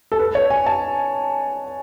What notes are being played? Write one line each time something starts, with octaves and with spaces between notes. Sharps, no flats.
A4
B4
C#5
G#5
A5